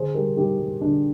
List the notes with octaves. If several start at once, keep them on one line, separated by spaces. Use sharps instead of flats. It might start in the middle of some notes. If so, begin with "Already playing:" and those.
Already playing: D3 G#4 C5
G3 G4 A#4
G3 D#4 G4
G3
D3 D4